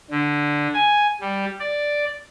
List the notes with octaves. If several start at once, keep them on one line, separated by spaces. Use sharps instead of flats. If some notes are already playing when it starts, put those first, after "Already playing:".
D3
G#5
G3
D5